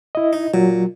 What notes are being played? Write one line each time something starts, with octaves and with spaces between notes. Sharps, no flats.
E4 D#5
D#4
A#2 F#3